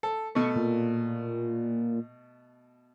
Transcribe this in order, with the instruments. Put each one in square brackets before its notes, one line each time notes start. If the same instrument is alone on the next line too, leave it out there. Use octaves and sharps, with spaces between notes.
[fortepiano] A4
[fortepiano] B2 A3 [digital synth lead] C#6
[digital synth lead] A#2